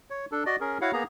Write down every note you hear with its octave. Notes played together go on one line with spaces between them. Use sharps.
C#5
D4 A4
F#4 D5 D#5
C#4 G#4 A#4
E4 F#4 C#5 F5 F#5
A#3 B3 G#4 A#5